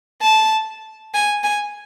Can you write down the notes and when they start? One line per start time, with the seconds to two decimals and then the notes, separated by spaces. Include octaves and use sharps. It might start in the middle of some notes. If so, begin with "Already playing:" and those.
0.22 A5
1.14 G#5
1.44 G#5